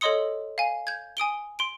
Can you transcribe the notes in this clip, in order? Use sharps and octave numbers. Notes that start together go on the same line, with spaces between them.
A4 C#5 D#5 C6 D#6 C#7
F5 G#5
G6 G#6
G#5 D#6 D7 G7
C6 D7